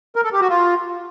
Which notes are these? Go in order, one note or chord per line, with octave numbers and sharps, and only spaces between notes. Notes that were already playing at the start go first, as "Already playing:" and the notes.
A#4
A4
G4
F#4
F4